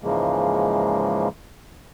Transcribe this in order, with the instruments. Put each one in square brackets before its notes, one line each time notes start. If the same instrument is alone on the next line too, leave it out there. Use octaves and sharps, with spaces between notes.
[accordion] G#2 C#3 E3 F3 G#3 A#3